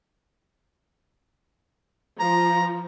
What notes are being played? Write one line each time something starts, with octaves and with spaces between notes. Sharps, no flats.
F3 A#5